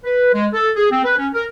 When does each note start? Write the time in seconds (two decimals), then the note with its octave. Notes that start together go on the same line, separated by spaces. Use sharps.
0.04 B4
0.34 G#3
0.53 A4
0.75 G#4
0.91 C4
1.04 B4
1.17 C#4
1.34 A#4